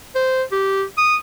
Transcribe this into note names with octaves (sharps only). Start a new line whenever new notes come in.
C5
G4
D#6